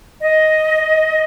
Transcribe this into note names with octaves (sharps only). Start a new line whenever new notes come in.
D#5